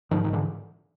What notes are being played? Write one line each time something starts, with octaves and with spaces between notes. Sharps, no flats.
G#2 D#3 F3
D#3
D3 E3